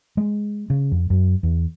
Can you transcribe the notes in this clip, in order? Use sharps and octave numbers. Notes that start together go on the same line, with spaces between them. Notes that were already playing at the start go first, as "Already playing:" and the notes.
G#3
C#3
F2
F#2
E2